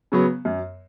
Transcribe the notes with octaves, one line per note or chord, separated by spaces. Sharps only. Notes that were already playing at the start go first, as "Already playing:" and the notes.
C#3 F#3 B3
F#2